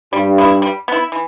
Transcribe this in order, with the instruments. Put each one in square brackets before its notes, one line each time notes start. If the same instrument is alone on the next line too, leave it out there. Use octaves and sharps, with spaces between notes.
[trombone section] G2 [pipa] G3
[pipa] B3 E4
G3
B3 E4
E3